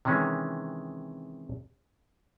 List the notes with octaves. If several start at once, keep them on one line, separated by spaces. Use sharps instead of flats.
C3 D#3 E3 G#3 C#4